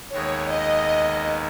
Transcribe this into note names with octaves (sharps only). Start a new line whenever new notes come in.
D#2 D#3 G#3 B3 C#5
D#5